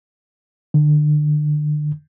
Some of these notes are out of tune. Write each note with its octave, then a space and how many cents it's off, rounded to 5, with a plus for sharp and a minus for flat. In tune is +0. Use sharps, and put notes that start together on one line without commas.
D3 +30